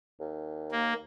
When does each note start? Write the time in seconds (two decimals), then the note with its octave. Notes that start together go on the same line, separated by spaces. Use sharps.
0.20 D#2
0.71 A#3